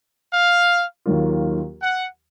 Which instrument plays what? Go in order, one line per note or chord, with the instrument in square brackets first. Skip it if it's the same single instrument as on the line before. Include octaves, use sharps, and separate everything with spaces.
[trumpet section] F5
[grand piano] D#2 D#3 F#3 A#3 F4
[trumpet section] F#5